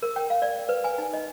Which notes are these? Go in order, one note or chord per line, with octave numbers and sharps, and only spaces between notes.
A#4
G5
F5
D5
B4
G#5
D#4
D#5